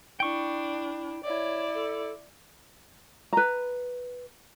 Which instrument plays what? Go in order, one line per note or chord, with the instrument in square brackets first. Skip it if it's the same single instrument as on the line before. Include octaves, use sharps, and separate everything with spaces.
[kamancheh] D4 [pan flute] E4 [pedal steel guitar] G5 C#6
[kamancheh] E4 D5 [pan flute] C#5
[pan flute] A4
[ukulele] B4 A#5